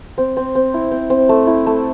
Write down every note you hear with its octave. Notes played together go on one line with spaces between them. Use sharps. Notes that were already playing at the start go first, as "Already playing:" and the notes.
C4
C4
C4
E4
C4
C4
A3
E4
A3